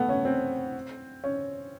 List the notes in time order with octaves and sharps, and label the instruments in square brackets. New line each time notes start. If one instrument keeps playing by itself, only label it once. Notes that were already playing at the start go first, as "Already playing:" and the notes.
Already playing: [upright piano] A3 B3
C#4
C4
C#4